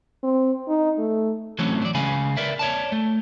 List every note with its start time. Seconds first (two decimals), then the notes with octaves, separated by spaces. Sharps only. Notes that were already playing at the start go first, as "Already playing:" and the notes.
0.23 C4
0.68 D#4
0.99 A3
1.59 E3 F#3 A3 C4 C#4
1.82 F#3 D5
1.94 C#2 C#3 B4 F5 G#5 B5
2.37 A#4 B4 D5 E5
2.59 C#5 D5 A5
2.92 A3